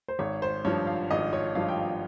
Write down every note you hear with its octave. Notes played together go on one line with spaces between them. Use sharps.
C5
G#1 C#5
C5
G2 F3 C#5
F5
G#1 D#5
C#5
G2 F3 F5
G5
F5